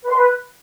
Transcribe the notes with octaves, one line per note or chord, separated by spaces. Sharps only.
B4
C6
B4